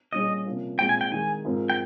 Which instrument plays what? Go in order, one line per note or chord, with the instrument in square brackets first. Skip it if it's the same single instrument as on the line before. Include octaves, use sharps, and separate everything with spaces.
[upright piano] A#2 G3 C#4 G#4 [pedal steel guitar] D#5
[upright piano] C3 F3 A#3 C#4
[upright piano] A#2 G#3 C4 [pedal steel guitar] G5
[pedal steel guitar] G#5
G5
[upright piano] D#3 G#3 D#4 [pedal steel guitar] G#5
[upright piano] G#2 F3 C4 F4 A#4
[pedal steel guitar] G5